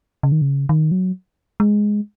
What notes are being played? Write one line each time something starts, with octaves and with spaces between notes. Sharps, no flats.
C#3
D#3
C#3
D#3
F#3
G#3